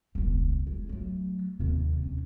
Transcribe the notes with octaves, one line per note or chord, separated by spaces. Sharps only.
E1 C#2
G#3
F#3 A3
D#2 C3
C#4